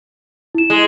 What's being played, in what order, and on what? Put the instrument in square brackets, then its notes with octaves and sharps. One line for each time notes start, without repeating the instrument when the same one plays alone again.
[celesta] E4 E7
[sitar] G#3